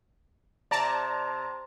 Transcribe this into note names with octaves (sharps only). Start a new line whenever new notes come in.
C3 D5 A5 A#5